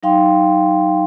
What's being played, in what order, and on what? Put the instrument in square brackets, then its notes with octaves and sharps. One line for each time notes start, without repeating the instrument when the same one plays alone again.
[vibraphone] F#3 D#4 F5 G5 C6